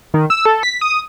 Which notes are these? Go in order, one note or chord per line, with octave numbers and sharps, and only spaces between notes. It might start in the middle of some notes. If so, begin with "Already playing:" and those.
D#3
E6
A4
B6
D#6